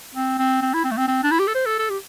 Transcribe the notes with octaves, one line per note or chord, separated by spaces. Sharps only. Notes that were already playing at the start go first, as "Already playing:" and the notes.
C4
C4
C4
E4
C4
A3
C4
C4
D4
E4
G4
A4
C5
A4
A4
G4